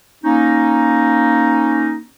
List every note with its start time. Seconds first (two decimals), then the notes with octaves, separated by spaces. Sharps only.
0.24 A#3 C#4 D#4